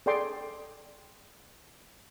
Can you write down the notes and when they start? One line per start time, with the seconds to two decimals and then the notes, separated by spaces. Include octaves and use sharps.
0.06 G#4 A4 D5 G5 C6 D6